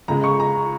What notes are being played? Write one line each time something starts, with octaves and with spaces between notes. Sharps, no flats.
C#2 C#3 G#3 A#5
C#6
A#5